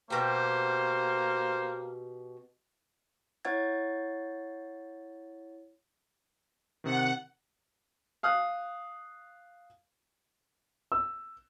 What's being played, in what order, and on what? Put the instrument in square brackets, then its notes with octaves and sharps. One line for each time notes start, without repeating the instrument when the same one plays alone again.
[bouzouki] B2 G4 [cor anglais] A#3 [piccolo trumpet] C5
[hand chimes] E4 C#5 F#5 G#6 A6
[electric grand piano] C3 D#3 [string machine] F#5
[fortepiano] F5 D#6 F#6
[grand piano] E6